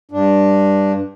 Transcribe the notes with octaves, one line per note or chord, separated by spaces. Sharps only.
G2 D4